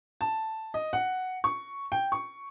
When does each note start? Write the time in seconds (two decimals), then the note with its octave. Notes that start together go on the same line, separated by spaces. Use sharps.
0.21 A5
0.74 D#5
0.93 F#5
1.44 C#6
1.92 G5
2.12 C#6